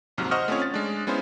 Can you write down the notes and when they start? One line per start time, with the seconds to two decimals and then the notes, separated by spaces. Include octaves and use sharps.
0.18 A#1 D#2 G#2 C3 F#3 F6
0.31 C5 D#5 F#5 C#6 D#6 F6
0.48 A3 C4 C#4 F4 C#5
0.62 A6
0.74 G#3 D4
1.07 G#3 B3 C#4 E4 C5